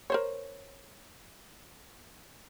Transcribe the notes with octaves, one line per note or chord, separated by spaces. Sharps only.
A#4 C5 C#5